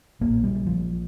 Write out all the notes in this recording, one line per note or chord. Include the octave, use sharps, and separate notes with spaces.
A#1 A#2 A#3
G3
F3